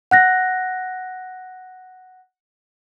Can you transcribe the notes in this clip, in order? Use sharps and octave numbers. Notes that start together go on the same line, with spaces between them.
F#5 F#6 A#6